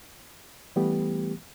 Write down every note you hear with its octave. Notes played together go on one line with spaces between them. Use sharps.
E3 G3 A3 B3 G4